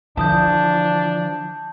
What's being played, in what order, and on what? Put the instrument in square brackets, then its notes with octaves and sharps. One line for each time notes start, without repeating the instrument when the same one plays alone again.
[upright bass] D3 [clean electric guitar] E3 F3 [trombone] D4 [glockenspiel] A5 D#6 G6